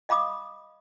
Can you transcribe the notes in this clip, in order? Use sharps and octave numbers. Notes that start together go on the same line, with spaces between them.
D#5 F5 B5 D6 D#6